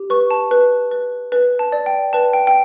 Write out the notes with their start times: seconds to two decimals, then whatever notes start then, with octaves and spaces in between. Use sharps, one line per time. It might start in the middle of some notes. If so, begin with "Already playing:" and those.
Already playing: G4
0.10 B4 C#6
0.31 A5
0.51 B4
0.92 B4
1.32 B4
1.59 A5
1.72 D5
1.86 G5
2.13 B4 A5
2.33 G5
2.47 G5